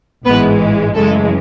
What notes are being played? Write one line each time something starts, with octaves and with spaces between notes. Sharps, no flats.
A1 G#2 E3 G#3 B3 B4
F#2 C#3 E3 G#3 A3 A4